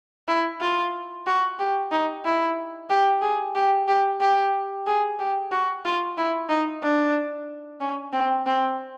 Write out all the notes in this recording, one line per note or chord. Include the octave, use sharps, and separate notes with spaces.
E4
F4
F#4
G4
D#4
E4
G4
G#4
G4
G4
G4
G#4
G4
F#4
F4
E4
D#4
D4
C#4
C4
C4